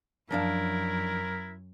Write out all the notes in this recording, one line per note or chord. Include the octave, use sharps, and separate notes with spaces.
F#2 F3 D4 E4 A#4 F5